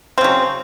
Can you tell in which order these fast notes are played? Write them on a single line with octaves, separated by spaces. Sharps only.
C4 C#3 F#3